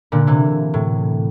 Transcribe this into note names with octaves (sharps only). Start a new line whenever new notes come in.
A#2 D3
C3 E3
A2